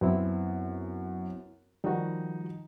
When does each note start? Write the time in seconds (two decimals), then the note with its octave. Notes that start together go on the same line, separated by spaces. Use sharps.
0.01 F#2 B3 C4 E4
1.84 D#3 F3 G3 D#4 F#4